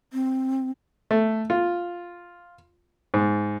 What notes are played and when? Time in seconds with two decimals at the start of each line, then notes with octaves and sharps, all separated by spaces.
0.13 C4
1.11 A3
1.50 F4
3.14 G#2